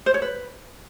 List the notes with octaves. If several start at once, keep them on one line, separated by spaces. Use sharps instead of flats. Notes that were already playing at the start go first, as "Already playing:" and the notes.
C5
C#5
B4